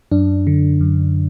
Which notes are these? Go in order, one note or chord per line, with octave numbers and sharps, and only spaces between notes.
F#2 D4
D3
F#2